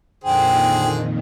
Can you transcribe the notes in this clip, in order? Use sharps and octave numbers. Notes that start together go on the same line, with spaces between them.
F2 A#2 D3 D#3 G#4 C5 G5